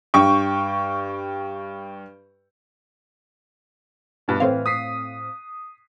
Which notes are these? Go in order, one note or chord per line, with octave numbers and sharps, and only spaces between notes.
G2 G5 C#6
G2 B2
A2 E3 C4 F5
D#6 B6 C7